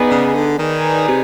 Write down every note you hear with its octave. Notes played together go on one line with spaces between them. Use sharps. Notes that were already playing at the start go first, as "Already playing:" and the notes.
Already playing: B3 D#4 G#4 B4 D5
C#3
D3
D#3 D#4 G#4 B4 D5
C3